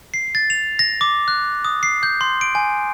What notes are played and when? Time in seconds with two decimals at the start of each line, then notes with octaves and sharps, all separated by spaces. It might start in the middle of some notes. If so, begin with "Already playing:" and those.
0.14 C7
0.35 A6
0.50 F7
0.79 A#6
1.01 D6
1.28 F#6
1.65 D#6
1.83 C7
2.03 G6
2.21 C6
2.41 D7
2.55 G#5